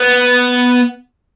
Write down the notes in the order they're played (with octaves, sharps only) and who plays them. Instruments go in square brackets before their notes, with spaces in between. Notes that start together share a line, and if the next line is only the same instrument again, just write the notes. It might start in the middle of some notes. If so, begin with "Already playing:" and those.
Already playing: [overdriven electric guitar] B3